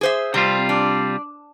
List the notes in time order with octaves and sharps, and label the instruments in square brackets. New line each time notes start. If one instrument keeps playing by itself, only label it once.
[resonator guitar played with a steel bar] G#4 C5 E5
[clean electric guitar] C3 G3 F4 [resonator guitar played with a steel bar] C4
[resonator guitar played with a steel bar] D4